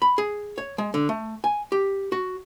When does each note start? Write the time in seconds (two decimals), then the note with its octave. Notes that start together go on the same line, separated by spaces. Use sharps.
0.02 B5
0.18 G#4
0.58 C#5
0.78 G#3
0.94 D3
1.09 A3
1.44 G#5
1.72 G4
2.12 F#4